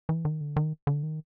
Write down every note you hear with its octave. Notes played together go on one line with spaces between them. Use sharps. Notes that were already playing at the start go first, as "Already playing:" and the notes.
E3
D#3
D3
D#3
D3
D#3